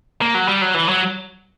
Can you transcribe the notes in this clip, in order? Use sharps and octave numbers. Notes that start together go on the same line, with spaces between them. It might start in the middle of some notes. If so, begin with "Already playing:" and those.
A#3
F#3
G3
F#3
E3
F#3